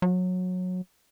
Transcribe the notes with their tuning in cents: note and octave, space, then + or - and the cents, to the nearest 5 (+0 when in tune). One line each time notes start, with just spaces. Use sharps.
F#3 -20